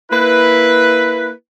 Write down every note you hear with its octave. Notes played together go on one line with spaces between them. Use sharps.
A#3 E4 B4